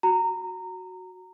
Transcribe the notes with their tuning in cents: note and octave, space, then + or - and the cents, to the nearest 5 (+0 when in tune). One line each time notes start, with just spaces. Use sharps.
F#4 +0 A#5 -20